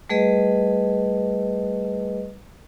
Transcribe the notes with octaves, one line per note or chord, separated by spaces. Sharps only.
G3 A3 G#4 B4 D#5